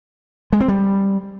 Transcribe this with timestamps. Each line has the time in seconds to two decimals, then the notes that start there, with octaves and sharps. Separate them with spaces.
0.53 G#3
0.60 C4
0.68 G3